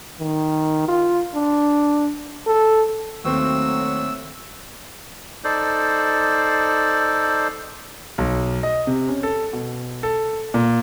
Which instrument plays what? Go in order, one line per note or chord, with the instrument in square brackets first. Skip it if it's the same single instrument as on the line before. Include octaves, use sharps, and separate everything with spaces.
[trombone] D#3
F4
D4
A4
[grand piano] D#2 C4 [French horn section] F#3 A3 [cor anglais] F#4 [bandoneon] E6
[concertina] D#4 A4 C5 D5
[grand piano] B1
D#5
C3
C#4
A4
B2
A4
A#2